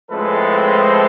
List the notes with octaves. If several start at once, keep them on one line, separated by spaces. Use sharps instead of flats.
A2 F3 G#3 C4 A4 B4